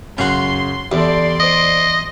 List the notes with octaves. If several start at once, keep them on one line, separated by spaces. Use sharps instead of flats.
F#2 C#3 C#4 F#4 C6
E2 G4 A4 D5 C6
C5 D#5 D#6